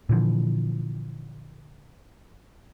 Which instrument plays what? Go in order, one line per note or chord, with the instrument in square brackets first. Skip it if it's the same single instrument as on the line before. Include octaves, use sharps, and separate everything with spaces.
[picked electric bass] A#2 D3 E3 F3